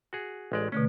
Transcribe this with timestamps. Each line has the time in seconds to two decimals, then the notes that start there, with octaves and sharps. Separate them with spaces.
0.13 F#4 G#4
0.52 A1 G#3 D5
0.72 B2 D3 A3 C#4